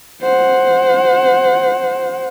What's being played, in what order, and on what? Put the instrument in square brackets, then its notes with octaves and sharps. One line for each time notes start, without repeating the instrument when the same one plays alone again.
[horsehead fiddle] C5 F#5